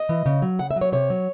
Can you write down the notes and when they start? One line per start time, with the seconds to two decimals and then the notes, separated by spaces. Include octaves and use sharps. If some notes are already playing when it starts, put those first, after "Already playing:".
Already playing: D#5
0.09 E3
0.26 C#3
0.42 F#3
0.59 C#3 F#5
0.71 E5
0.76 F#3
0.81 C#5
0.92 C3 C#5
1.10 F#3